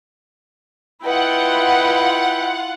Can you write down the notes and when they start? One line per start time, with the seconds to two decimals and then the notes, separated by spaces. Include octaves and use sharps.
1.04 E4 F4 B4 D#5 F#5 G5